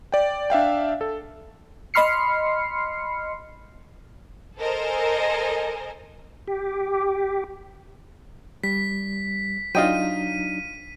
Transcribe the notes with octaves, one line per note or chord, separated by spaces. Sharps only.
D5 G5
D4 E5 F5 G5
A4
D#5 B5 C6 F6 C7 C#7
A4 A#4 C5 D#5 G#5
G4
G3 B6
F#3 D4 D#4 F4 D#5 G5 D#7